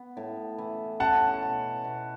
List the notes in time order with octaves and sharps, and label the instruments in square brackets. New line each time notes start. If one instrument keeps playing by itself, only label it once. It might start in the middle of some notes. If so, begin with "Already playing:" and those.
Already playing: [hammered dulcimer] B3
A2
E3
[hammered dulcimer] C#4 [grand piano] F#5 A5
[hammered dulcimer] B2
B2